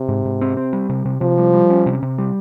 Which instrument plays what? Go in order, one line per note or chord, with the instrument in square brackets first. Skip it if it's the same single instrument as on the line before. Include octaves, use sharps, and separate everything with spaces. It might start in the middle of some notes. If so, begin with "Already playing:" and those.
Already playing: [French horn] C3
[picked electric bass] G#2
G#2
C4
C4
G3
C3
C3
[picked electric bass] C3 [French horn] F3
[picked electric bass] G3
G3
C#4
C3
C3
G3